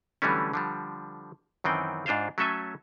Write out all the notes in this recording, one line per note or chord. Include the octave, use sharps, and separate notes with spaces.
D3 E3 F#3 G3 A3 C#4
D3 F3 G3
F#2 D#3 E3 C4 G5
G#2 D4 F4 C5 F5
F#3 A3 C#4 A4 E5 G#5